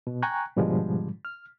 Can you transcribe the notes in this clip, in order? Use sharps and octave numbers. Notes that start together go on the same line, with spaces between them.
B2
G5 G#5 A#5 C#6 F#6
G#2 B2 D3 F3 G3 G#3
F6